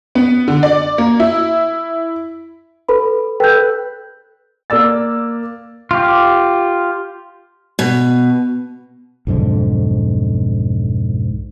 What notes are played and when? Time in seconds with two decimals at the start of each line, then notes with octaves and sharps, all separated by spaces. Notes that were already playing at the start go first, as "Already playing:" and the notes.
0.15 B3
0.48 D3
0.63 D5
0.98 A#3
1.20 E4
2.89 A4 B4 B5
3.40 A4 B4 G5 G6
4.70 A#3 D5 E6 A6
5.91 F4 G4
7.79 B2
9.27 B1 F2 G#2 D3